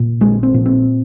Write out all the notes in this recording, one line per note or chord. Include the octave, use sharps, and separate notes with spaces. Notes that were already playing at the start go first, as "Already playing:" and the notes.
Already playing: A#2
A#1 G#3
C4
A#2
C4